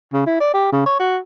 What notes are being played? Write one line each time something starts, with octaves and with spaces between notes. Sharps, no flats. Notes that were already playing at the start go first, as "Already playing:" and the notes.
C#3
E4
D5
G4
C#3
C#5
F#4